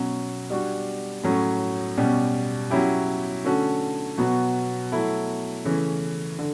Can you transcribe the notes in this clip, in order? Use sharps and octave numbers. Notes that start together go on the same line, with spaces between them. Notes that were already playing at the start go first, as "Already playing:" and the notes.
Already playing: B2 F#3 C#4
G3 D4 F#4
A2 F#3 A3 C#4
B2 G3 C#4 G4
F#3 C#4 E4 G4
D3 A3 C#4 F#4 A4
B2 F#3 B3 F#4
F#3 A3 E4 A4
C#3 E3 A3 C#4
D3